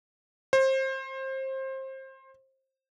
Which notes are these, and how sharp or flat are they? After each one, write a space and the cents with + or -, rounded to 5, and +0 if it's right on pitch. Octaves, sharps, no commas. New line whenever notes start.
C5 +25